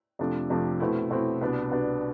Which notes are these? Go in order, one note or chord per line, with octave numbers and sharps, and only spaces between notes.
F2 C3 F3 A3 D4
F2 C3 F3 A3 D4
B2 A3 C4 E4
B2 A3 C4 E4
C2 B2 B3 D4
C2 B2 B3 D4